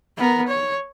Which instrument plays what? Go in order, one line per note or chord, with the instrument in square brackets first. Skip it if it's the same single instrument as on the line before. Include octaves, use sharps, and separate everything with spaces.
[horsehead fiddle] B3 A#4
C#5